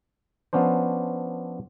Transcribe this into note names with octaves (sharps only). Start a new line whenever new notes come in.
F3 B3 C#4 D4 C5